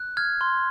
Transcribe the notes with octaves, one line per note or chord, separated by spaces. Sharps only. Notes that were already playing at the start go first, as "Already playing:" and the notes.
Already playing: F#6
F6 G#6
C6